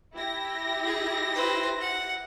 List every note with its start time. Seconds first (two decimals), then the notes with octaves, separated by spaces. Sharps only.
0.14 E4 G4 A#6
0.86 G#4
1.35 B4 C5
1.81 F#5